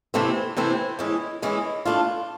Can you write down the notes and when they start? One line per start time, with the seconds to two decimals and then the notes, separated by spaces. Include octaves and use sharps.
0.14 C3 E3 A3 C4 E4
0.57 C3 E3 A3 C4 E4
0.99 E3 G#3 C#4 E4
1.42 E3 G#3 C#4 E4
1.85 E3 A3 D4 F4